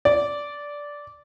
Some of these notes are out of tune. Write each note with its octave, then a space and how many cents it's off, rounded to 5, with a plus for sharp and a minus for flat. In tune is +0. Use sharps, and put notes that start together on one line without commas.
D5 -10